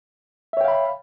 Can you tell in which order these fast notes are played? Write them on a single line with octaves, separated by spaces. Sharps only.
E5 C#5 G5 F5 B5